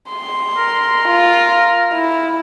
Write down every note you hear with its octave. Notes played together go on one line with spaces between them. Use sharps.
C6
A#4
F4
E4